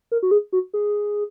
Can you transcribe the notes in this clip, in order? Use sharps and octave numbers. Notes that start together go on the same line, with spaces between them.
A#4
F#4
G#4
F#4
G#4